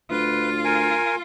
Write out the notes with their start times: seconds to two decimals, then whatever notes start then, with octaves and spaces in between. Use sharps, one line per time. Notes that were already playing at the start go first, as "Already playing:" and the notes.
0.11 D2 F4 B4
0.64 A#4 G#5